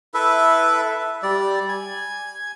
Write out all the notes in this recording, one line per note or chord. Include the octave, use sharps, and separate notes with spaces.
E4 A4 B4 E5
G3 D5
G#5